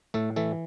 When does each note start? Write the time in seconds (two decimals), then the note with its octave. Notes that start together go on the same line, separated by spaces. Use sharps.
0.14 A2 A3 A4
0.36 E3 A3 A4